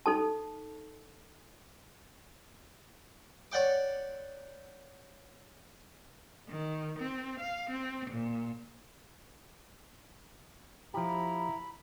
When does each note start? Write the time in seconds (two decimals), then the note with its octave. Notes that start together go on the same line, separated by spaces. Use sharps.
0.06 D#4 A4 A5
3.52 C#5 D5 F#5 G5 D6
6.49 D#3
6.99 C4
7.40 F5
7.70 C4
8.11 A#2
10.94 F3 E4 G4 A#5 B5